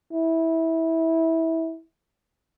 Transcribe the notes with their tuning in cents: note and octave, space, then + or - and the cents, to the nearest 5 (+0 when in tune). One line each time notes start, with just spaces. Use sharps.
E4 -20